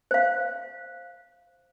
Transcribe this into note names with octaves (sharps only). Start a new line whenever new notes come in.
C5 F5